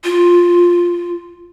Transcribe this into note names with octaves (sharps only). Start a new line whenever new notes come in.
F4